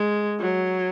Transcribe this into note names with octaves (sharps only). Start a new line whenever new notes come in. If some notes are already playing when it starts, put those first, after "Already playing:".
Already playing: G#3
F#3